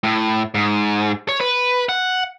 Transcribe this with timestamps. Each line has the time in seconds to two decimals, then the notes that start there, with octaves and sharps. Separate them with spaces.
0.04 A2
0.55 G#2
1.29 C#5
1.41 B4
1.89 F#5